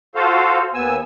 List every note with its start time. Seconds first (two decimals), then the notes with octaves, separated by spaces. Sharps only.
0.15 F4 F#4 A4 C5 F5
0.74 D#2 B3 G#5 E6